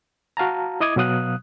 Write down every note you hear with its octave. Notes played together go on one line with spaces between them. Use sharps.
F#4 F5 A5 A#5
E4 D#5 D6 D#6 G#6
B2 F#3 F5 D#6 F#6